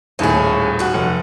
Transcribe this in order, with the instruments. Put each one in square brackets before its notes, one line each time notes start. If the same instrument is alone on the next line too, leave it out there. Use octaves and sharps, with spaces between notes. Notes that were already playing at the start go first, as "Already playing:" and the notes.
[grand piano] D#1 D#2 A2 [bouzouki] C#4 G#4
[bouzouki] C#4 F#4
[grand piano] F1